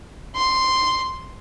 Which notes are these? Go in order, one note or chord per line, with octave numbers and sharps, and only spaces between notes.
C6